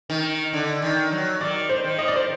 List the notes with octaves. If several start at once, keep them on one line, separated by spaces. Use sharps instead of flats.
D#3
D3
D#3
F#3
D#3 D5
C5
D#3
D#5
D5
C5